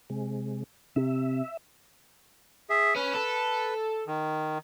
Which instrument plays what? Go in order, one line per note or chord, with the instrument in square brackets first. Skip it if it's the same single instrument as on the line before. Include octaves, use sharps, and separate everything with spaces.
[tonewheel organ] C3 G#3
[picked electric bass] C3 [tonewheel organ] E5
[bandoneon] G#4 E5
[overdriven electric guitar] C#4 [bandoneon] B4
[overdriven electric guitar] A4
[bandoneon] D#3